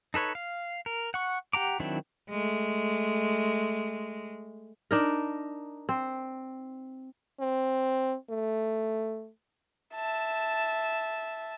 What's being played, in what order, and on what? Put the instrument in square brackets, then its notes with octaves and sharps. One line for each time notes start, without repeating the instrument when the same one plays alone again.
[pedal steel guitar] D#4 A4 B4 C#5
F5
A#4
F#5 C#6
G4 F#5 A#5 D6
D#3 F#3 C4 D4 E4
[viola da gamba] G#3 A3
[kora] D4 D#4 A#4
C4
[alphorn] C4
A3
[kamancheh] E5 A5